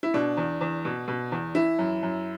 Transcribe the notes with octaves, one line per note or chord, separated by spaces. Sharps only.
E4
B2 D4
E2
E2
B2
B2
E2
E3 E4
F#2
F#2